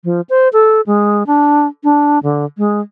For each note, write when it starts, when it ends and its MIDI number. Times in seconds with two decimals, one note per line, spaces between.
0.04 0.21 53
0.29 0.48 72
0.53 0.81 69
0.87 1.23 56
1.27 1.67 62
1.84 2.19 62
2.23 2.45 50
2.58 2.80 56